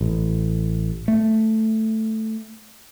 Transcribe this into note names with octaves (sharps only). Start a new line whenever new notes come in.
A1
A3